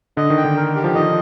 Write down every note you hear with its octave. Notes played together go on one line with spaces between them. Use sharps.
D3 D#5
D#3
G5
D3
A#4
G4
F3
D#3 D#5